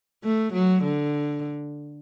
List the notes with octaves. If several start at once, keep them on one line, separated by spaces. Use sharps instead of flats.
A3
F#3
D3